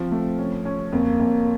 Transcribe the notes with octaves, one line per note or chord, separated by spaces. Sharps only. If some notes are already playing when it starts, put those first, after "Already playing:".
Already playing: F3 C4
A3
C#4
C#4
F2 A#3
F2